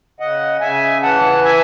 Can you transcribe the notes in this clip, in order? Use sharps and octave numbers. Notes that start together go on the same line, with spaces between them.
C#3 D#5 F#5
C#3 E5 G#5
E3 F#5 A5
E5 G#5